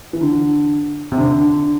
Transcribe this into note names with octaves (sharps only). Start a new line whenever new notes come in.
E3
D3
C3
D3
D3